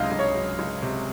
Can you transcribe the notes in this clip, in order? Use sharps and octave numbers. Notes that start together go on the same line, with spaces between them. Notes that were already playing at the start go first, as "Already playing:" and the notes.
Already playing: C#2 C3 F#3 D#5 F5
C#2
C#5
F#3
C#2
C3